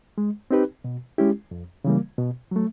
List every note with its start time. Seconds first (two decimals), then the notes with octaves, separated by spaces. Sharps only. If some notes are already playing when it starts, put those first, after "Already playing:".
0.18 G#3
0.51 C4 D#4 G4 B4
0.84 B2
1.18 G#3 C#4 E4 G4
1.51 F2
1.84 C#3 E3 G3 A#3
2.18 B2
2.51 F#3 A3